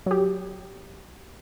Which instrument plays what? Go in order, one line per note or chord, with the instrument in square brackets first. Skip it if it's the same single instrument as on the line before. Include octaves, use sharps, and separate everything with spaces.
[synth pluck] F#3 G4